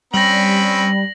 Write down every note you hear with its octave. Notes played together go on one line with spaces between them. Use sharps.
G3 C4 C#4 B5 A#6 F#7